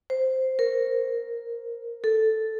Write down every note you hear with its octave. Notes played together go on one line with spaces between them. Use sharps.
C5
A#4
A4